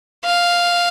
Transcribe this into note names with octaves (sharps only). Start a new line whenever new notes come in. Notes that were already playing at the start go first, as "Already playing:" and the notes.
F5